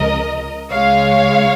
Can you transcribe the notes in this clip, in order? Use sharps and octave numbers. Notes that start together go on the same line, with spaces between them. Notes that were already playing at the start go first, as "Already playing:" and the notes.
Already playing: C#2 C#3 F3 A#4 D#5
C#2 C#3 G#3 C#5 F5